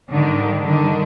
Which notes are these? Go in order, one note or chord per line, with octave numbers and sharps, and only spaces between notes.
G#2 D3 D#3 G3 D4
G2 D3 D#3 G3 D4